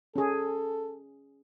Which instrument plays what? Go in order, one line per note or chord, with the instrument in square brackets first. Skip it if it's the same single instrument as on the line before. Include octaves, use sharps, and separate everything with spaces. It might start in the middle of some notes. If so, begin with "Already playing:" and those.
[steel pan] C#4 G#4 [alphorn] A4